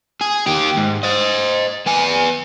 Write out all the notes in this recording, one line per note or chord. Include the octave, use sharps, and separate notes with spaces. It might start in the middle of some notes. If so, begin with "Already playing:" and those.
G#4
D#3 G4
G#2
C5 D#5
B3 G#5